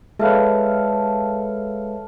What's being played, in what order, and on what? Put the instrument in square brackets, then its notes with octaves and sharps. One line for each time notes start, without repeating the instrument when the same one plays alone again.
[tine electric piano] G#3 B4 [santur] A4 F5 [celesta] C#5 E5